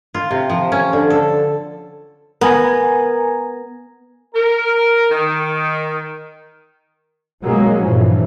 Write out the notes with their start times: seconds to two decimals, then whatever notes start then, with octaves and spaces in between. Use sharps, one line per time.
0.14 F4
0.31 C3
0.50 F3
0.72 C#4
0.93 D3
1.10 A4
2.41 B3 A#4 G#5 A#5
4.34 A#4
5.10 D#3
7.42 B2 F#3 G#3 A#3 C#4
7.83 G2 A#2 E3 F3